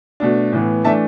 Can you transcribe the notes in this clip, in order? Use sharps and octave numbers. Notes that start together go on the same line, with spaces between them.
B2 A3 D4
A2 E3 B3
E3 A3 D4 E5 A5